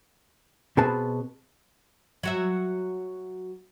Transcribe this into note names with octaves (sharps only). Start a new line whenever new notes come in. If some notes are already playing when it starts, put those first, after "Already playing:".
B2 C4 G#4 B4 A5
F#3 F#4 E5